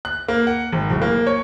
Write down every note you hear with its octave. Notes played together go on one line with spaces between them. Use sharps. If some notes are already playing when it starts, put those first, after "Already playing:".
F#6
A#3
F#5
G#1
D1
A#3
C#5